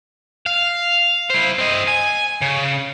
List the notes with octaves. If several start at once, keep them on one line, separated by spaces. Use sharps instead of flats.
F5
E4 C5
C4 D#5
G#5
C#3